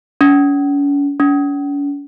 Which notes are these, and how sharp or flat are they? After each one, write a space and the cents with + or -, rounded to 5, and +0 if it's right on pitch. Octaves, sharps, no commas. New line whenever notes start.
C#4 +40
C#4 +45